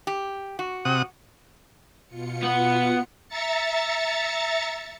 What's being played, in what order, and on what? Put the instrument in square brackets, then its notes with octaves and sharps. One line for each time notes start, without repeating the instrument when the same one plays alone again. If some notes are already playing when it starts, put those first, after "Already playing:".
[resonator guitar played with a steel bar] G4
F#4
[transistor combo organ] C3 F#5 D#6
[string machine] B2 F4 C#7
[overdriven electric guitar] B3 F#5
[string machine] E5 A#5 A6 C#7